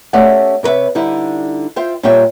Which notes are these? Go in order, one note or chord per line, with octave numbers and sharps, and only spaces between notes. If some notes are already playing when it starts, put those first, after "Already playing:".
A3 C#4 G4 D5 E5 F#5
C3 A#4 B4 C#5 E5
D3 G3 D#4 E4
F4 C5 E5 G5
A#2 G3 G4 C#5 E5 G5